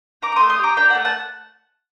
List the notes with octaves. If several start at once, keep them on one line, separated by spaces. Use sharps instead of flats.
D#4 A#5 D6
D6
A3 C6 D#6
C6 D#6
G4 A#5 D6
D4 G5 A#5
A3 F#5 A5
F#5 A5